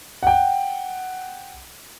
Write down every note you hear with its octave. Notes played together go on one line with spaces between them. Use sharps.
F#5 G5